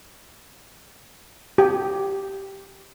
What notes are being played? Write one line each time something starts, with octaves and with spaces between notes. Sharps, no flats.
G4